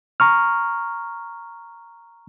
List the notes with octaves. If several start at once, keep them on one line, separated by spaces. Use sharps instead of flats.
A#5 C#6 F6